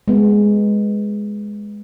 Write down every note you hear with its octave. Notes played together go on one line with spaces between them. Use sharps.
G#3 B3